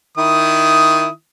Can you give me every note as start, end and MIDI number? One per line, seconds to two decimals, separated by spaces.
0.18 1.08 51
0.18 1.08 64
0.18 1.08 87